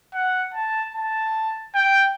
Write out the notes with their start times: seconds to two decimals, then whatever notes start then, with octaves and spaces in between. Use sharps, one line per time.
0.14 F#5
0.54 A5
0.94 A5
1.75 G5